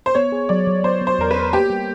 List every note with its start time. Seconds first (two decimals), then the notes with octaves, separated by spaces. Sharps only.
0.06 C5
0.15 B3 C#5
0.32 G#4
0.49 F#3 D5
0.67 F#3
0.84 B3 C5
1.01 B3
1.07 C5
1.19 E2 A#4
1.31 B4
1.36 B3
1.53 A#3 G4
1.70 G3